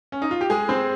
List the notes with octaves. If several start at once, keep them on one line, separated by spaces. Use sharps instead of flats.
C#4
D#4
F4
G4
G#3 G#4
C4 C5